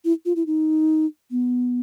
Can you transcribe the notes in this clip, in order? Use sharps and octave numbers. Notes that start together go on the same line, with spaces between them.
E4
F4
E4
D#4
B3